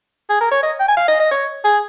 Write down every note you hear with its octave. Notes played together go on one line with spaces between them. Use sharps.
G#4
A#4
C#5
D#5
G5
G#5
F5
D#5
D#5
C#5
G#4